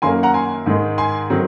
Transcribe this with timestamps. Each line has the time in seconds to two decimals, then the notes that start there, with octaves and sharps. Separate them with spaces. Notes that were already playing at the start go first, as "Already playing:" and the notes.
0.02 F#2 D#3 A#3 C#4 G#5 C6
0.23 F#5 A#5
0.34 G#5 C6
0.66 G#2 D#3 G#3
0.98 G#5 C6
1.30 D#3 F#3 C4